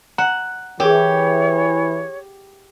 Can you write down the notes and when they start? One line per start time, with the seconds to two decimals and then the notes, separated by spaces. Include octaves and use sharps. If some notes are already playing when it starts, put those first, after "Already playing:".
0.18 F#5 A#5
0.80 E3 G4 G#4 A#4 C#5